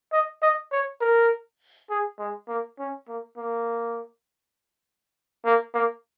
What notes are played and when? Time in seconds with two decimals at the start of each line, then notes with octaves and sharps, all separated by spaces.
0.13 D#5
0.42 D#5
0.72 C#5
1.01 A#4
1.90 G#4
2.19 G#3
2.48 A#3
2.79 C#4
3.08 A#3
3.37 A#3
5.45 A#3
5.74 A#3